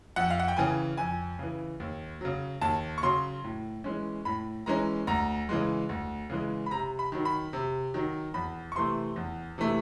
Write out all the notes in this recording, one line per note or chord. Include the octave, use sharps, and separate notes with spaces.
F2 F#5
F5
F#5
G5
C#3 E3 G#5
F2 G#5
C#3 E3
D#2
C#3 F#3
D#2 A5
C#6
C#3 F#3 C6
A2
E3 G#3 C#4
A2 B5
E3 G#3 C#4 A#5
D2 A#5
C#3 E3 G#3
D2
C#3 E3 G#3
B5
C3 A#5
B5
D#3 F#3
B5
C3
D#3 F#3
E2 B5
C#6
C3 E3 A3 C6
E2
C3 E3 A3